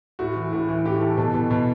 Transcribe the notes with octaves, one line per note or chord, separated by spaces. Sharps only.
A2 F#4
E3
A2
E3
A2 G4
E3 A4
B2 A4
B2
B2